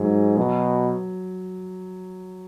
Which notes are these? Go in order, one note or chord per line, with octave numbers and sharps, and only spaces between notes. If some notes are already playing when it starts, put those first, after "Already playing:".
Already playing: G#2 F#3
B2 F#3